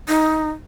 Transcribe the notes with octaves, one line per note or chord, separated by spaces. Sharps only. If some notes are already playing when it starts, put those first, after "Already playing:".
D#4